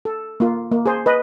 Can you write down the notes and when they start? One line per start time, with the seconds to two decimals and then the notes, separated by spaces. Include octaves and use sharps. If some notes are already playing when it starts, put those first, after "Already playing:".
0.05 A4
0.40 A#3 F4
0.72 A#3
0.86 G#4 C5
1.06 B4 D#5